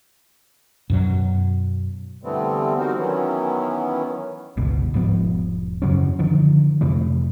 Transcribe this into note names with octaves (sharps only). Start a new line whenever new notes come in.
F#2 B2 F#3
D3 E3 G3 A3 B3 C4
G3 C4 D#4 F#4 A#4 C5
D#3 E3 F#3 B3 C#4 E4
G1 C#2 B2
E1 G#2 F3 B3
F#2 C#3 F#3 C#4
D3 D#3 F3
F2 C3 E3 A3